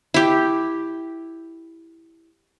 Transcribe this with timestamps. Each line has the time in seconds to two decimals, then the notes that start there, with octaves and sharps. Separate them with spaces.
0.14 E4 G4